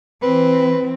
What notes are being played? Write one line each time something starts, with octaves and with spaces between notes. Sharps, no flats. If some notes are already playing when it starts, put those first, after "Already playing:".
E3 C4 B4